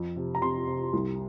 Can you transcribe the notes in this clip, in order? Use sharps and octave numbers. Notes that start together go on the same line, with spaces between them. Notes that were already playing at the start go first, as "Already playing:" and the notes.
Already playing: F2
C3
A#5
C3 C6
C3
C2